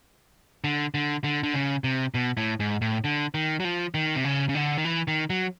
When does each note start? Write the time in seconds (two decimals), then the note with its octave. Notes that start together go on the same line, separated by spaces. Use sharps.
0.64 D3
0.94 D3
1.24 D3
1.43 D3
1.54 C#3
1.84 C3
2.14 B2
2.37 A2
2.60 G#2
2.82 A2
3.04 D3
3.34 D#3
3.60 F#3
3.65 F3
3.94 D#3
4.16 C3
4.24 C#3
4.49 C#3
4.55 D3
4.78 D#3
4.85 E3
5.08 D#3
5.30 F#3